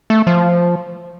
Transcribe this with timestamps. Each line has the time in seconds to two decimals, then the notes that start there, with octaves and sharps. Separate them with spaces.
0.10 A3
0.27 F3